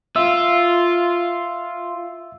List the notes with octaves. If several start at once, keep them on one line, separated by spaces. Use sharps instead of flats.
F4 E5 E6